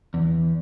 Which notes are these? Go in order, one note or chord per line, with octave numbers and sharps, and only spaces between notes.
E2